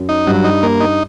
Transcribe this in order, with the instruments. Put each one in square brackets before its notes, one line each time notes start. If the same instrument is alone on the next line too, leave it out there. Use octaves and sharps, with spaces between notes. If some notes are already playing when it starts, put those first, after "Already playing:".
Already playing: [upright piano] F#2
[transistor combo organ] D#4
[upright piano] G2 [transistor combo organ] F#3
[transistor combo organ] D#4
A#3
D#4